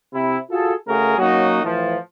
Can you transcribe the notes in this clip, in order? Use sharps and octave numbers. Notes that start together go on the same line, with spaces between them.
C3 E4
F4 F#4 G#4 A4
C#3 A3 F#4 G#4 A#4
F#3 A#3 C#4 D#4 F#4
A2 E3 F3